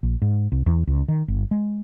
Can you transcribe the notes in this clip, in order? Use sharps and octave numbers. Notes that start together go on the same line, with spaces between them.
A#1
G#2
C2
E2
C#2
D#3
G1
G#3